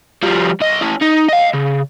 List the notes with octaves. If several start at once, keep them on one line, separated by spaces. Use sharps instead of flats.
F3 G3
C2 D#5
C#4 E4
D#4
D#5 F5
C#3